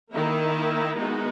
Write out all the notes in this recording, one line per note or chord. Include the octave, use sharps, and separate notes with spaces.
D#3 A#3 E4
G#3 B3 D#4 F#4